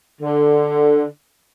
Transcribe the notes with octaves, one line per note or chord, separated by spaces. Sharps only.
D3